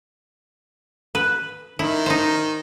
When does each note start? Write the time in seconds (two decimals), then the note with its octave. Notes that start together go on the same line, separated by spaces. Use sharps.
1.15 B4
1.79 D#3 E4
2.06 D#4 C5